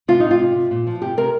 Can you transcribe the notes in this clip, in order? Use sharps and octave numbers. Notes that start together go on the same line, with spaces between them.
C3 F4
C3 D#4
F4
C3
C3
A#2
F3
C3 G4
C3 A#4